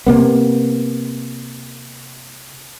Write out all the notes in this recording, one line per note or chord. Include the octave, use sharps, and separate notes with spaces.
C3 A#3 B3